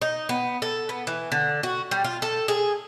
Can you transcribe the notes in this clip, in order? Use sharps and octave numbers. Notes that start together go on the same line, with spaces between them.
D#4
B3
A4
B3
E3
D3
F#4
G3
F4
A4
G#4